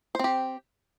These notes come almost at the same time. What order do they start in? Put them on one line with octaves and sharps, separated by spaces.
C5 C4 G4